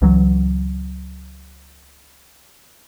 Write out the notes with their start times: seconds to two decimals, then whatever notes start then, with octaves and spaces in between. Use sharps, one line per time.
0.02 C#2 E3 F#3